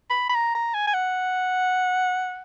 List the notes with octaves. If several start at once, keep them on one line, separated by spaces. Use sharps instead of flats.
B5
B5
A#5
A#5
G#5
G#5
F#5